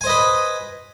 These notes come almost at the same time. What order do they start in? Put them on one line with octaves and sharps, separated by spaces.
G#5 C5 D#5 B4